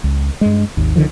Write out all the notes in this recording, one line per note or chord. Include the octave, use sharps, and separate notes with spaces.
C#2
G2 G#3
G#1 D#2
C2 D3 D#3 F3